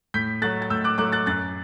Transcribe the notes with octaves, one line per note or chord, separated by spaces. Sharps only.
A2 G6 B6
F#3 A3 F#6 A6
A6
A2 E6 G6
D6 F#6
F#3 A3 D6 F#6
F#6 A6
F#2 F#6 A6